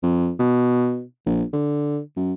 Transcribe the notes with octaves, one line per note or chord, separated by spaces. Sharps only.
F2
B2
A#1
D3
F#2